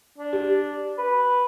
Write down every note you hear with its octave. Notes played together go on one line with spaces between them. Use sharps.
D4
G4
B4